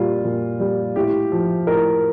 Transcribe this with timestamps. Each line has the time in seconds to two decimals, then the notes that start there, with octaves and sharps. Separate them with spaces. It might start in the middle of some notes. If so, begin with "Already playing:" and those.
Already playing: A#2 G3 F4
0.25 A#2
0.60 G3
0.96 A2 G4
1.32 F3
1.67 A2 A#4